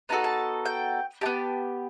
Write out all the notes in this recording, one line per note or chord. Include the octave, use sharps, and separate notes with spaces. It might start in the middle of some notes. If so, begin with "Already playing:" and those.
B3 D#4 F#4 A4 A5
A5
G5
B3 D#4 G4 A5